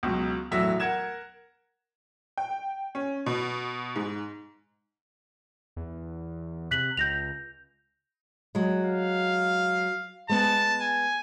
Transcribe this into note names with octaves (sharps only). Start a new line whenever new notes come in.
C#2 B2 F#3
E1 A2 F#3 E5
A#4 F#5 G#6 E7
G5
C#4
B2
G#2
E2
C3 F#6 B6 F#7
C#2 G6 A#6 F7
F#3 G#3
F5
G#3 B3 A5
G#5